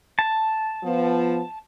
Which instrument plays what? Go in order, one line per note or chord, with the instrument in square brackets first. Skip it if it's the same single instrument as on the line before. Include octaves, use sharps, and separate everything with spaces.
[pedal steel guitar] A5
[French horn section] F3 B3